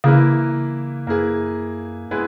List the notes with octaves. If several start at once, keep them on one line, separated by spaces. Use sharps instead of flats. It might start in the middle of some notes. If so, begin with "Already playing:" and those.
C#3 E3 A#3 E4 B4
F#2 A#3 E4 G#4 B4
G#3 B3 E4 G#4 B4